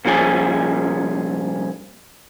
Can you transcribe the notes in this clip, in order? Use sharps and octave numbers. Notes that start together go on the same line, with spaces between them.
C2 A#2 F3 C#4 G#4